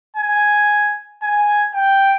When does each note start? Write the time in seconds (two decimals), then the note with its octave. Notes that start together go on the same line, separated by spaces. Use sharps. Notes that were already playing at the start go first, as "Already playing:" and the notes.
0.17 G#5
1.23 G#5
1.75 G5